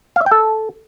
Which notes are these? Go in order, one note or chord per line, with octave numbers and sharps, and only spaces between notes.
F5
E5
G5
A4